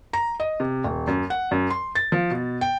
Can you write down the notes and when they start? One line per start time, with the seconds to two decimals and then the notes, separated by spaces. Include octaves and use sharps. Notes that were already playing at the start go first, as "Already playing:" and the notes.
0.13 A#5
0.40 D#5
0.60 C3
0.84 D#1
1.07 F#2
1.30 F#5
1.51 F#2
1.70 C6
1.95 A6
2.12 F3
2.31 B2
2.61 G5